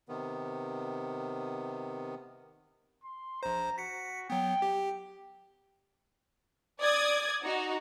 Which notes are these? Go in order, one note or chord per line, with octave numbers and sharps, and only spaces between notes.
C3 D#3 B3
C6
A#1 C5 A#5
F#4 B6 C#7
F#3 B3 G5
G4
D5 D#6 G#6
D#4 F#4